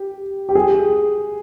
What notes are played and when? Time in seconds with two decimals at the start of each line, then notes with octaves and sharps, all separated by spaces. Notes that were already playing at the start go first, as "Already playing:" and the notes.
Already playing: G4
0.49 G4
0.55 G#4